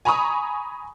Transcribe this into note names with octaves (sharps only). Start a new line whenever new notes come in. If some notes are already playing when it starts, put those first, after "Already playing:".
G#5 A#5 B5 C#6 D#6